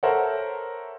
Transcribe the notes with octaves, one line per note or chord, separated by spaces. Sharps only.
A4 A#4 C5 C#5 E5 F#5